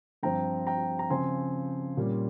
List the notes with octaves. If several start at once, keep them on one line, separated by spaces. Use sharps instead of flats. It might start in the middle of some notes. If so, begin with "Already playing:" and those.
G2 F3 C4 G5 A#5
G5 A#5
A#5
C#3 F3 C4 G#5 C6
A#2 G3 A#3 C#4